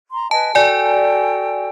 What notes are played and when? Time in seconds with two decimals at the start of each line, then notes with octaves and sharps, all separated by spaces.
0.12 A#5 C6
0.31 B4 D#5 G#5 A5
0.55 F#4 A4 D5 G5 G#5